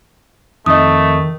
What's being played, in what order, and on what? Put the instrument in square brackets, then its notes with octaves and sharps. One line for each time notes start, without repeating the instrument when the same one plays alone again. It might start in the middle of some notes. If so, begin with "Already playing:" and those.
[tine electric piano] F2 [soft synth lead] D#3 [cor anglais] A3 [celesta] D#5 D#6